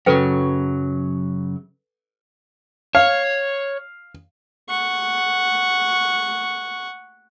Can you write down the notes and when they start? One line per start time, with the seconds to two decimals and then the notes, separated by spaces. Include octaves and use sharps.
0.06 F#2 C#3 F#3 A4 B4 G5
2.95 C#5 F5
4.69 F#5 C#6